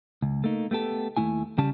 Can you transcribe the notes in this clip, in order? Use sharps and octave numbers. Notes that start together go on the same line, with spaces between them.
C#2
A3 A#3 D#4
A3 B3 G4 A4
D#2 D#3 A3 E4 G#5
C#3 G3 C#4 A5